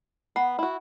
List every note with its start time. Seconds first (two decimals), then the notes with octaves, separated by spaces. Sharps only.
0.36 B3 F#5 A#5
0.59 E4 F#4